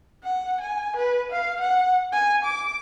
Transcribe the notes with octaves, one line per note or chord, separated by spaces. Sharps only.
F#5
G#5
B4
F5
F#5
G#5
D6